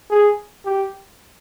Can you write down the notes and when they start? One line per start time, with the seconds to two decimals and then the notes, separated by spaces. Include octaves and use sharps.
0.10 G#4
0.65 G4